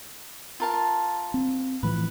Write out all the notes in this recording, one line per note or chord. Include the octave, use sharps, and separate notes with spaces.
F4 A#4 A5
C4
A2 E3 F3 B4